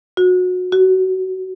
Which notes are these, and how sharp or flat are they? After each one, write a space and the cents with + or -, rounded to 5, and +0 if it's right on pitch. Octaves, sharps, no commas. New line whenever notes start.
F#4 -25
F#4 +25